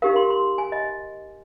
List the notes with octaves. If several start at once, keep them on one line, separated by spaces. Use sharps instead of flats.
D#4 G4 A#4 F5
C6
C6
G#5
D#5